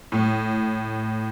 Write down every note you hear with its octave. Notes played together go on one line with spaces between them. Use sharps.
A2